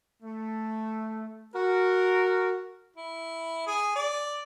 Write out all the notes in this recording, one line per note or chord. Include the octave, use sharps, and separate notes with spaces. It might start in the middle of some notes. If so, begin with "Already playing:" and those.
A3
F#4 A#4
E4
G#4
D5